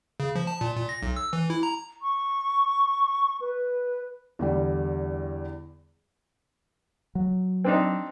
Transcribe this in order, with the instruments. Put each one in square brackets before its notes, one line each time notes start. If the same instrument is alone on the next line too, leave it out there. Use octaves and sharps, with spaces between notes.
[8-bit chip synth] C#3
F3
A5
A#2
A#2
A#6
B1
E6
E3
E4
A#5
[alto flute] C#6
B4
[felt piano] E2 D3 G3
[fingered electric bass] F#3
[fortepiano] C4 D4 D#4